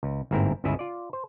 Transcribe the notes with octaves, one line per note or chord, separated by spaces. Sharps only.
C#2
G1 G#2 A#3 C4 E4 A#4
G1 C#2 C#3 E4 G#4 E5
F4 D5
C5